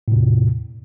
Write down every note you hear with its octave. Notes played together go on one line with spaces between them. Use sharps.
E2 A2 C3